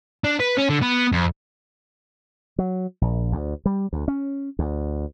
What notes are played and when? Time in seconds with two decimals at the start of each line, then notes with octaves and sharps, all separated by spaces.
0.24 D4
0.40 B4
0.58 C#4
0.69 D3
0.82 B3
1.12 F2
2.59 F#3
3.01 A#1
3.32 D2
3.66 G3
3.93 D2
4.08 C#4
4.59 D2